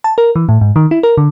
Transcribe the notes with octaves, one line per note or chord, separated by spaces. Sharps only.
A5
A#4
E3
A2
G#2
D#3
E4
A#4
D3